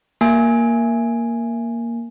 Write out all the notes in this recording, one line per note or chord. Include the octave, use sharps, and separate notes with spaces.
A#3 G#5